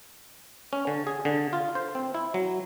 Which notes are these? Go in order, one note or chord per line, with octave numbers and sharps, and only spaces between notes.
C#4
D3
G#4
D3
F4
C5
C4
E4
F#3